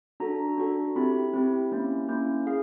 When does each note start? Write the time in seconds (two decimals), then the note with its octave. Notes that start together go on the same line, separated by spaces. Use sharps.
0.20 D4 F#4 A4 A#5
0.58 D4 F#4 A4
0.96 C4 E4 G4 B5
1.34 C4 E4 G4
1.72 A#3 C#4 E4
2.09 A#3 C#4 E4
2.47 G#4 F5